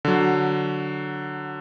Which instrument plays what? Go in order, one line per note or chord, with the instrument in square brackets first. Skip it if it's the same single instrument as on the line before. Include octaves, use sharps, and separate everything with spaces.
[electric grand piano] D3 F#3